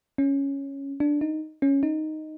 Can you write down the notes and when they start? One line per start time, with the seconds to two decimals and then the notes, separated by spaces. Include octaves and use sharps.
0.18 C#4
1.00 D4
1.21 D#4
1.62 C#4
1.83 D#4